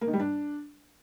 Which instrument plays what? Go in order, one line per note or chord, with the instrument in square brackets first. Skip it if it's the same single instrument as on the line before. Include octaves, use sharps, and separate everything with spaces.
[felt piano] A#3
D#3
G3
D4